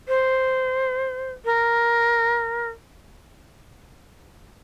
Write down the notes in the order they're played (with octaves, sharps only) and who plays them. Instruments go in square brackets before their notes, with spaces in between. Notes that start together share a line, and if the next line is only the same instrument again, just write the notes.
[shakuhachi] C5
A#4